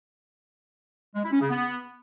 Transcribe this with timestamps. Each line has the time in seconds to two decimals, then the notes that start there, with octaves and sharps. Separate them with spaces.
1.15 G#3
1.24 E4
1.33 C#4
1.41 C#3
1.50 B3